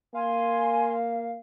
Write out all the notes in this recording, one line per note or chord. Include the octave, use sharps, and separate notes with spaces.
A#3 F5 G#5 C6